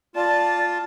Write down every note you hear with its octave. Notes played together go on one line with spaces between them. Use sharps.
F4 D5 A5